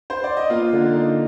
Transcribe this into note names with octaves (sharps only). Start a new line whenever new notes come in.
C5
D5
D#5
A#3 F4 F5
D3
D#4